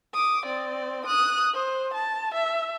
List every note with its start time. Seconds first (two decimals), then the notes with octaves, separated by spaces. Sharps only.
0.13 D6 D#6
0.46 C4 D5
1.06 D#6 F#6
1.53 C5
1.94 A5
2.34 E5